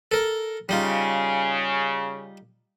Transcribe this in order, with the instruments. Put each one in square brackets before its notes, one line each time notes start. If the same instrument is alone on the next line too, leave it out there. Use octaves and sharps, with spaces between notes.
[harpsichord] A4 A#4
[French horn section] C#3 [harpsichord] G3 D#4 F4